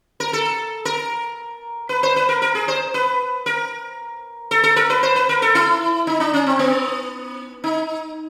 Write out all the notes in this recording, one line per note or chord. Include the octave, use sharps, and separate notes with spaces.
A#4
A4
A#4
B4
C5
B4
A#4
A#4
G#4
C5
B4
A#4
A4
A4
A#4
B4
C5
B4
A#4
A4
E4
D#4
D4
C#4
C4
B3
D#4